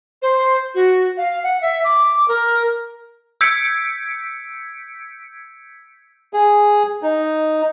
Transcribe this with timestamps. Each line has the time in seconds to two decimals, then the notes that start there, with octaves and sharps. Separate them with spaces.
0.22 C5
0.75 F#4
1.17 F5
1.43 F#5
1.61 E5
1.84 D6
2.28 A#4
3.41 E6 G6 G#6 B6 C#7 D7
6.33 G#4
7.03 D#4